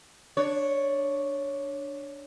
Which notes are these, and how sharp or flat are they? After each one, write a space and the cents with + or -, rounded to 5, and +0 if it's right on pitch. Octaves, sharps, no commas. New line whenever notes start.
D4 +0 C#5 +0